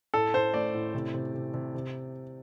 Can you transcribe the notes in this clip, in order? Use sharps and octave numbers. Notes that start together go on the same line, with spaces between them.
A2 A4
A2 C5
A3 D5
A2
C3
C3
C3
C3
C3